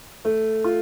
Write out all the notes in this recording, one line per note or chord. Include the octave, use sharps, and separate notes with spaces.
A3
F4